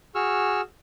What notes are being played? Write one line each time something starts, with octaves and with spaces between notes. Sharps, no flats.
F#4 G#4 C#6 E6 F6